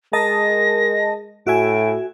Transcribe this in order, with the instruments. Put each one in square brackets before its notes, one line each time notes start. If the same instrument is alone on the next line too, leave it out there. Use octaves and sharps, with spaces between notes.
[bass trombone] G#3 [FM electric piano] A#4 D#5 A5 [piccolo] A#6
[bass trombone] A2 [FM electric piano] F#4 E5 G#5 [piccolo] D7